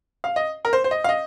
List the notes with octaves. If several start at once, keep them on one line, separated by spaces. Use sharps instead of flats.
F5
D#5
A#4
C5
C5
D#5
F5
D#5